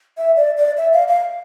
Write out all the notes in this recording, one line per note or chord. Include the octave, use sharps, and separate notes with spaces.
E5
D5
D5
E5
F5
F5